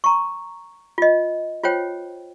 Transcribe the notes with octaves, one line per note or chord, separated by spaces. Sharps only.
A#5 C#6
F4 D#5
F4 C5 C#5 G5